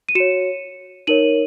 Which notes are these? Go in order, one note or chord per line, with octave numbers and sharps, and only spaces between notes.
D#7
F#4 C#5 C#7 E7
D#4 A#4 C#5 D#7 F#7